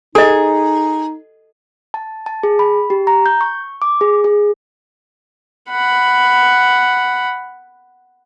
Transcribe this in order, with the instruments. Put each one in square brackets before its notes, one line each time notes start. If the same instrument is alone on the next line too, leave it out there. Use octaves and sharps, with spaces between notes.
[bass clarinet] D#4 [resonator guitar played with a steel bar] G#4 [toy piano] A4 D#5
[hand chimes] A5
A5
G#4
B5
G4
A#5
G6
C#6
D6
G#4
G#4
[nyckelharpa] F#5 B5